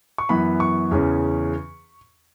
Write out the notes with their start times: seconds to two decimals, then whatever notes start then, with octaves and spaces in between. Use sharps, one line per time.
0.18 C#6
0.29 F#2 E3 B3 B5
0.60 C#6
0.91 E2 C#3 E3 C#4